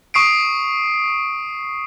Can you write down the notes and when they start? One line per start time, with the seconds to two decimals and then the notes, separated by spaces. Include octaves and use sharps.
0.14 C#6 D#6 C7 D7